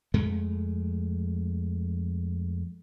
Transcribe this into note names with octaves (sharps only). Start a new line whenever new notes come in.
F2 G#3 A3